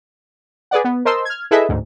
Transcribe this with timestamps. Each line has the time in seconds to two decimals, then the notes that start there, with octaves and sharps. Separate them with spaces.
0.71 G#4 B4 D5 F#5
0.84 B3
1.05 A#4 C5 D#5 A5 C6 E6
1.25 F6 G#6
1.51 E4 G#4 A4 B4 D#5 E5
1.69 A1 D2 G#2